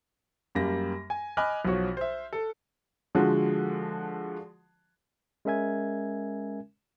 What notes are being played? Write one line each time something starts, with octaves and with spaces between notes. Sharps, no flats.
F#2 G3 A#3 A#6
G#5
D#5 G#5 B5 D6 F6 F#6
B1 F3 F#4 C#5
C5 E5
A4
D3 F3 G#3 F#4
G#3 C#4 A#4 E5 G#5 G#6